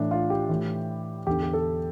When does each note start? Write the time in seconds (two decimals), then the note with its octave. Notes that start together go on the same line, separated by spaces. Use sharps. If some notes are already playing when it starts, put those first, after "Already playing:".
Already playing: A2 E3 D4
0.11 F4
0.30 G4
0.49 A2 E3
1.27 E2 D3 G4
1.43 G4
1.53 A4